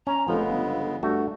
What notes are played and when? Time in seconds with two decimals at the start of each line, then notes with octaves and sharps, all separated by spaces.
0.07 C#4 A#5
0.28 F1 C#3 F3 G#3 B3 A4
0.49 G1
1.03 G2 A3 F#4